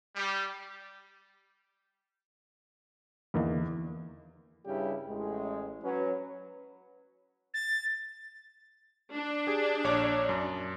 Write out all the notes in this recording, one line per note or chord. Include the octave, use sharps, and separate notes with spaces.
G3
E2 D3 A#3 D#4
G2 C#3 G3 D4 E4 G4
A1 G#3
F#3 C#4 B4
A6
D4
G4 G#4
A#1 C#5 D6
F#2